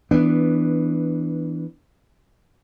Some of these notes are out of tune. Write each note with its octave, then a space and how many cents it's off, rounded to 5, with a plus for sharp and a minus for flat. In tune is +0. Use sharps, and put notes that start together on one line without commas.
E3 -10 B3 +0 D4 +0